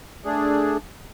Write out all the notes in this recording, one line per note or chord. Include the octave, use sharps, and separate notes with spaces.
A3 D4 G#4